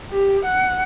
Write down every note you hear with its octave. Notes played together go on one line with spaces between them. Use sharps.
G4
F#5